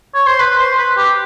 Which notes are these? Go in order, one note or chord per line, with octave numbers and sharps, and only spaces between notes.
C#5
C5
B4
C5
B4
G4